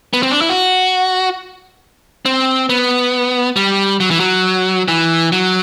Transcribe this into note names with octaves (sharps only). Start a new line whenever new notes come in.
B3
C4
D4
E4
F#4
C4
B3
G3
F#3
E3
F#3
E3
F#3